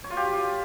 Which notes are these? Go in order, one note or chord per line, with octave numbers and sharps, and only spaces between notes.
C#5
F4
G4